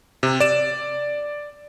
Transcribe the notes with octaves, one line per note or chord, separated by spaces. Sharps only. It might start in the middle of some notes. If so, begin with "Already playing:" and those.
C3
D5 E7